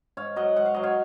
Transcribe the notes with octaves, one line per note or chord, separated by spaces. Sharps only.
G#2 C#5 F5
F#3 D#5 F#5
G#2 F#5
F5
F#3 D#5
C#5 F5